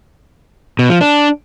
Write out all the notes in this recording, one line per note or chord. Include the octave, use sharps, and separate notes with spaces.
B2
F3
D4